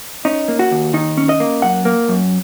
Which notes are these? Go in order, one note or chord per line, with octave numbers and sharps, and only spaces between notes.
C#4 D#4
A#3
F#4
D#2
D#3 D#4
C#4
D#5
A#3
F#2 F#5
A#3
F#2